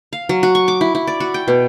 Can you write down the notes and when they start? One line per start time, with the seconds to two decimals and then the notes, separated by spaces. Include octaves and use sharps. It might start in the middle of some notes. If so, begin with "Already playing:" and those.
0.13 F5
0.29 F#3
0.43 F#4
0.55 C#6
0.68 D6
0.81 E4
0.95 E4
1.07 D5
1.20 F#4
1.34 G5
1.48 B2